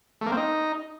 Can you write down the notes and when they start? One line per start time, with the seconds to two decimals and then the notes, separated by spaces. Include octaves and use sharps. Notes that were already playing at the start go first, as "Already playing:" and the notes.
0.21 A3
0.26 A#3
0.32 C4
0.37 D#4